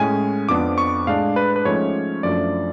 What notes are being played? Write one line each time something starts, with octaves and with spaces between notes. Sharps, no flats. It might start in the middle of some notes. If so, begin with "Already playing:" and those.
Already playing: A2 G#3 C#4 G#5
F2 F3 B3 D4 D6
C#6
A2 G#3 D4 F5
B4
B4
G#2 F3 A3 C#4 C#5
F#2 F3 A3 D4 D5